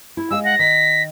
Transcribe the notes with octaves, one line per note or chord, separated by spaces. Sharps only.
E4
G#3 F5 E6
F#5 A#6
D#3 B6